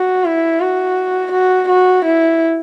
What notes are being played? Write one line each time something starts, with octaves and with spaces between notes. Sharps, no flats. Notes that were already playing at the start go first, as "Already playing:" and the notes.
Already playing: F#4
E4
F#4
F#4
F#4
E4